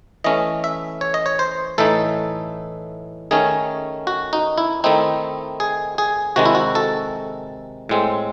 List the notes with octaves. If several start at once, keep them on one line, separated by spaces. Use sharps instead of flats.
E3 A3 C#4 D#5
E5
C#5
D#5
C#5
C5
A2 E3 A3 D#4 A4
D#3 A3 C#4 G#4
F#4
D#4
E4
D#3 A3 C4 D#4 E4
G#4
G#4
C3 D#3 G#3 F#4
E4
F#4
A4
A2 G#3 C4